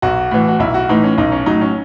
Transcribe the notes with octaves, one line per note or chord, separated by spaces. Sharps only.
B1 F#4
A2 E3
F#4
B1 E4
F#4
A2 E3 D#4
C#4
B1 D#4
C#4
A2 F#3 D#4
C#4